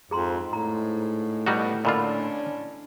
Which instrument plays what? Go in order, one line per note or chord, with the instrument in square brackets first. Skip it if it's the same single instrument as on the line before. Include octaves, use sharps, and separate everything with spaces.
[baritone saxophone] F2 [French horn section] G#2 [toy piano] G#4 A#5 C6
[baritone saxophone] A2 [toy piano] A#5
[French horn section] G2 B2 [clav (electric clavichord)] G3 D#4 F#4
[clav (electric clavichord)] A#2 D3 F4 [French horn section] C#4 D4 [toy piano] D#5 B5